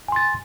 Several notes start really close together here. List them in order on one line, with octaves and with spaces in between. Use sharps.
G#5 C6 A6